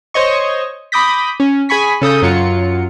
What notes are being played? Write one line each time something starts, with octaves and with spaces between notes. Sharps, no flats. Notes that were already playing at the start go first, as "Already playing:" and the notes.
C5 C#5 D#5 C#6
B5 D6 D#6 G6 A#6 B6
C#4
G#4 G#5 B5 C#6 B6
C#3 A4 D#6 G6
F#2 F#3 F4 C#7